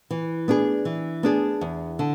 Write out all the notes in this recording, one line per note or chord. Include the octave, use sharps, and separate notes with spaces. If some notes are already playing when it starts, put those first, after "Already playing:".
E3
B3 D4 G#4
E3
B3 D4 G#4
E2
D3